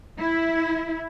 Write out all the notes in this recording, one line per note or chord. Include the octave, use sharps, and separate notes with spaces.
E4